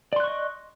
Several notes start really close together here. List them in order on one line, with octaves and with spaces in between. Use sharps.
D5 C6 F#6 C#6 D#5